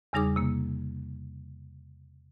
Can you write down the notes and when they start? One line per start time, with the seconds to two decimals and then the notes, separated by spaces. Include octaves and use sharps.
0.13 E2 C#3 G3 D#4 G#4 D6
0.36 C3 A#3